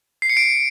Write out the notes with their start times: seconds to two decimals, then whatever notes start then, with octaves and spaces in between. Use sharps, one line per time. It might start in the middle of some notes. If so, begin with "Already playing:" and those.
0.22 C7
0.29 C#7
0.37 D7